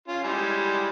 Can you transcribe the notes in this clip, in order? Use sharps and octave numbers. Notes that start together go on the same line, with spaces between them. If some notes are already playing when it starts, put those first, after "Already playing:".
C#4 F4
G3 G#3 E4